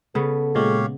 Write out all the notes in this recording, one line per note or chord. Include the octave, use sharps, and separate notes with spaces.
C#3 B3 A4
A#2 G#3 G4 C#5 F5